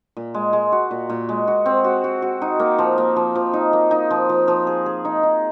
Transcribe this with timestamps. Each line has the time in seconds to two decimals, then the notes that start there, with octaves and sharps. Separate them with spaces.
0.17 A#2
0.34 G#3
0.53 G#3
0.72 F#4
0.91 A#2
1.10 A#2
1.29 G#3
1.48 F#4
1.66 C4
1.84 F#4
2.04 F#4
2.22 F#4
2.42 D#4
2.59 A#3
2.79 F3
2.98 A#3
3.16 F3
3.35 F3
3.54 D#4
3.73 A#3
3.91 D#4
4.11 F3
4.29 F3
4.48 F3
4.67 G#4
4.86 G#4
5.05 D#4
5.23 D#4